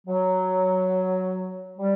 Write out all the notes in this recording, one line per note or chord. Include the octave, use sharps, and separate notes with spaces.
F#3
G3